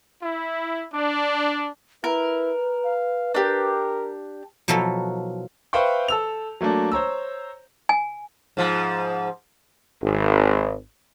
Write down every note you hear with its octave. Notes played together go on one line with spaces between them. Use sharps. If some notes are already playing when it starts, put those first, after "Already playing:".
E4
D4
E4 A#4 B4
F5
D4 G4 A#4
B2 F3 F#3 E4 A4 A#4
B4 C5 E5 F5 G5 C#6
A4 E6 F7
F#3 A3 A#3 D4
C5 C#5 A#5 E6
G#5
G#2 F3
G#1